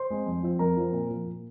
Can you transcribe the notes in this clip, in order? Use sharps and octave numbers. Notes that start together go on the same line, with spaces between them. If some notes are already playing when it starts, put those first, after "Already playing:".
Already playing: C5 C6
G#3 C4
F2
F3 C4
F2 A#4 A#5
F3 C4
A#2
F3 A#3
A#2